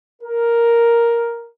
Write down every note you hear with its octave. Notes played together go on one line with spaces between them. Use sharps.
A#4